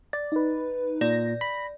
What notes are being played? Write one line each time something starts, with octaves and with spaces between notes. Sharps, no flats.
D5 A6
D#4 B4
A#2 D5 A#6
B5